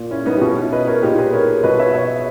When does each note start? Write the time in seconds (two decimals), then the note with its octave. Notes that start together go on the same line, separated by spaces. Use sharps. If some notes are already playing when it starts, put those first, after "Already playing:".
Already playing: A#2
0.11 C#4 E4
0.26 B3 D#4
0.37 G4
0.41 B2 C#4 E4
0.72 B4 D#5
0.87 A#4 C#5
1.02 A#2 D#4 G4
1.18 G#4 B4
1.33 A#4 C#5
1.63 B2 B4 D#5
1.79 C#5 E5
1.94 C#5 E5